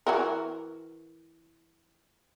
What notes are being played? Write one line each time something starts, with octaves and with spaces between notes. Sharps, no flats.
E3 F#4 A#4